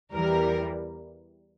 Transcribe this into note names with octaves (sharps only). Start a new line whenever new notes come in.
E2 E3 G3 A#4